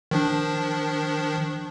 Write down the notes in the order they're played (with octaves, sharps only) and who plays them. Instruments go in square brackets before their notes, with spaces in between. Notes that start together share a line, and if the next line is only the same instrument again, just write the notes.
[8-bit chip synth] D#3 F3 D4